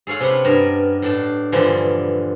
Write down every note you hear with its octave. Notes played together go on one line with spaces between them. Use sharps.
G#4 A4 C#5 F5 F#5
C3 C#4 G4 B4 F#5 B5
G2 B3 A#4
A2 D4 A5
G2 A#2 D3 E3 F3